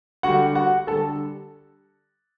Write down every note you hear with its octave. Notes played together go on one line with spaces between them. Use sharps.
D3 G3 F#4 F#5
F#4 F#5
D3 G3 A4 A5